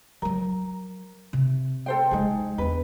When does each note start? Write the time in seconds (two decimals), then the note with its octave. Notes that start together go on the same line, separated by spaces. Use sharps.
0.22 F3 F#3 A#4
1.33 C3
1.86 A4 C5 G5
2.11 F3 G#3 D#4 G#4
2.58 E2 D4 B4